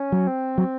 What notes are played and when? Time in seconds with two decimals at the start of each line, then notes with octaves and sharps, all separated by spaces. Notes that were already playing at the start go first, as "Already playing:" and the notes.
Already playing: C#4
0.12 F#3
0.27 C4
0.58 F#3